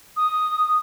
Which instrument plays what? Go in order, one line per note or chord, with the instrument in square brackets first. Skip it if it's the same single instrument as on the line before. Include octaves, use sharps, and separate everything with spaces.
[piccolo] D#6